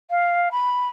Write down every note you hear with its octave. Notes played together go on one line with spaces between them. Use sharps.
F5
B5